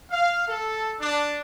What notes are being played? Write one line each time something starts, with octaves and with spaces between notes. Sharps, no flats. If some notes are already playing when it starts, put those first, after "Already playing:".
F5
A4
D4